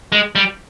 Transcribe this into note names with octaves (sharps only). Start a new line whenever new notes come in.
G#3
G3